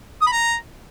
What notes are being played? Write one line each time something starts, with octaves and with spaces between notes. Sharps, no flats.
D#6
B5
A#5